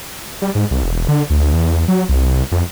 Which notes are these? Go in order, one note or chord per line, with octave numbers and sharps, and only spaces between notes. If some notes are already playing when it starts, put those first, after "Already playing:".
G3
G#2
C2
E1
D3
D2
E2
F#3
C2
F2